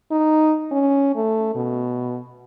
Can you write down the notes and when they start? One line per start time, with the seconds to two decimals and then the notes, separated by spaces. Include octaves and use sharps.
0.11 D#4
0.71 C#4
1.15 A3
1.55 B2